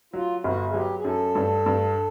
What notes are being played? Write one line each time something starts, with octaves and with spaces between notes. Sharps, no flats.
F#3 F4
G1 F#4
G#4
F#3 G4
G#4
F#2 A4
G2
G2